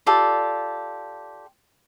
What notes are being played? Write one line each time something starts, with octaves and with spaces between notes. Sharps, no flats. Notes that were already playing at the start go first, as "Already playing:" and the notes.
F4 G4 A4 D5